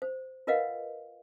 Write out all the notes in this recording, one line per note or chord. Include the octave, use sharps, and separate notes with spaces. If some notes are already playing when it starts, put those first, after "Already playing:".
C5
F4 A#4 B4 D#5 F5 F#5